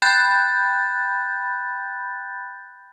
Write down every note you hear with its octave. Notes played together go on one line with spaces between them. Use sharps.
G5 B5 F#6 G6 A6